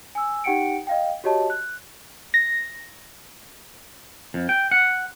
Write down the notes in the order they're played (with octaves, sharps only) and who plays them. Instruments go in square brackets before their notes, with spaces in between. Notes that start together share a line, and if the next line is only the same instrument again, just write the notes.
[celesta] G#5 E6
D#4 G4 F#5 G5 C#7 D7
D#5 F5 G5
F#4 G4 C#5 D#5 A5
F#6
[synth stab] A#6
[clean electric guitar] F2
G5
F#5